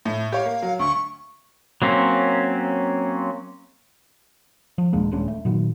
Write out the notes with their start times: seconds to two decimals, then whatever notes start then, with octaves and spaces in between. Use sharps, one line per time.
0.05 A2
0.32 G4 C#5 F5
0.46 A#3
0.62 F#3
0.79 D2 C#6
1.82 F#3 A#3 C4 C#4
4.78 F3
4.93 D#1 G#3 A#3 D4
5.11 D#1 G#3 C#4 D4
5.28 A3
5.45 A#2 D#3 F#3